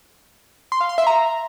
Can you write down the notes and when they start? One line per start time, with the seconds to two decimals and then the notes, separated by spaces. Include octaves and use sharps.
0.72 C6
0.81 F5
0.89 C6
0.98 E5
1.07 A#5